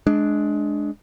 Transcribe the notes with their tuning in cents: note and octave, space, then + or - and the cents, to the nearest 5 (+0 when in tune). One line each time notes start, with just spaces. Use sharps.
G#3 +15 D4 +0